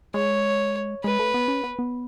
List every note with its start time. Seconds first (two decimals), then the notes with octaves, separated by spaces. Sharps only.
0.14 G#3 C#5
1.04 G#3 B4
1.19 A3
1.34 B3
1.48 C#4
1.64 B3
1.79 B3